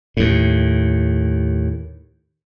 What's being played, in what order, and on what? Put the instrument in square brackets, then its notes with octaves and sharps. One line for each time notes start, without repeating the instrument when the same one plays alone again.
[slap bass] D#2 A2